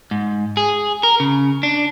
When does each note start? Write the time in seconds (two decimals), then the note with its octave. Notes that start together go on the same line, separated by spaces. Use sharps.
0.11 G#2
0.57 G#4
1.03 A#4
1.20 C#3
1.63 D4